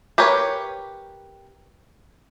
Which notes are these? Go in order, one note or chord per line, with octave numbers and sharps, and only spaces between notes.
G4 A#4 B4 C#5